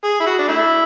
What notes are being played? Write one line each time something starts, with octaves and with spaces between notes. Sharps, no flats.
G#4
E4
F#4
D4
A3 E4